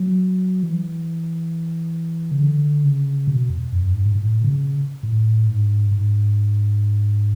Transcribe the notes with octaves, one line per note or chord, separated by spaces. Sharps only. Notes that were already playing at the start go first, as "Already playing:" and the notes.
Already playing: F#3
E3
C#3
D3
C#3
B2
E2
F#2
G#2
G#2
A2
B2
C#3
A2
G#2
G#2